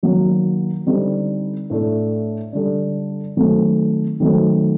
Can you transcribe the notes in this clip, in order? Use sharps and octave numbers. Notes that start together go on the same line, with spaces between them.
D#3 F#3 A#3
D3 G3 C4 D#4
A2 A3 D4
D3 G3 D4
D#3 F#3 A3 C4
D#3 F#3 A3 C4